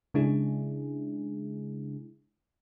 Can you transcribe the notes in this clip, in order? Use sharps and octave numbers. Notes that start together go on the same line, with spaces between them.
C#3 G#3 D4 E4 G#4